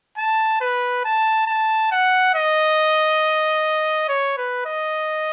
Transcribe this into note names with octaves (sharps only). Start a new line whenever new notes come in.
A5
B4
A5
A5
F#5
D#5
C#5
B4
D#5